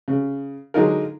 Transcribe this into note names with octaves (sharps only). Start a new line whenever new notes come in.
C#3
D3 F#3 G#3 D#4 F4 A#4